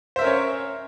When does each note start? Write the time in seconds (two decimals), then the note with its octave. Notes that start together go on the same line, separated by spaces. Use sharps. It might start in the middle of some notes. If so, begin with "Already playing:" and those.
0.16 C5
0.19 E5
0.21 A#4
0.24 C#4
0.27 C#5